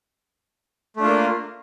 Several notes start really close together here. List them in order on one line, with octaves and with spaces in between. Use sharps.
A3 D4 F4 A#3